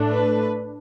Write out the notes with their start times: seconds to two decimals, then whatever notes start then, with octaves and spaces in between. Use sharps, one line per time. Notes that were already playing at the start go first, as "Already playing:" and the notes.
Already playing: A2 A3 D4
0.10 B4